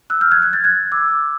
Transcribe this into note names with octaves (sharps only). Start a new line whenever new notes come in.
E6 F#6
F6 G6
F#6 G#6
F#6 G#6
G6 A6
F#6 G#6
D6 E6